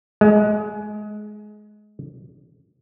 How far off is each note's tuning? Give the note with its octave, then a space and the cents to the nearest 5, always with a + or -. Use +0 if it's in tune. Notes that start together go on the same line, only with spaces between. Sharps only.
G#3 +20